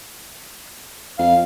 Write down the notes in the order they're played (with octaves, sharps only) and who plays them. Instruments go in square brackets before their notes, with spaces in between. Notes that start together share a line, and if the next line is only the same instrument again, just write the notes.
[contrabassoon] F2 [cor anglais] F5